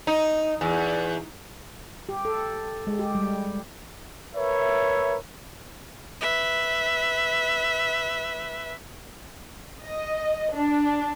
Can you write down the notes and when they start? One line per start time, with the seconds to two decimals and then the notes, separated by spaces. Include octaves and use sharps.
0.07 D#4
0.61 E2
2.09 G4
2.25 A4
2.87 G#3
2.99 G4
3.15 G3
4.35 A#4 B4 C#5 E5
6.21 B4 E5
9.81 D#5
10.54 D4